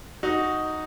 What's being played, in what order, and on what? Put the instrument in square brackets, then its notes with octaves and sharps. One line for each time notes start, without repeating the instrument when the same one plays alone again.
[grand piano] D#4 F#4